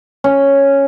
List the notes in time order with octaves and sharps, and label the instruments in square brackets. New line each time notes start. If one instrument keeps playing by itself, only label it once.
[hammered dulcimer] C#4